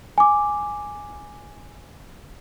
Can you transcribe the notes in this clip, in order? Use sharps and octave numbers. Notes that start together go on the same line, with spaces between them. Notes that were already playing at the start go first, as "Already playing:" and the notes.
G#5 D6